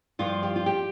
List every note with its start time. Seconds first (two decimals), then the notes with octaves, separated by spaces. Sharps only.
0.19 G2 F3 F4
0.43 G4
0.56 F4
0.66 G4